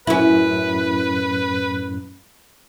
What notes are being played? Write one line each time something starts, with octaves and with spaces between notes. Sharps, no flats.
F#2 A2 C#4 E4 B4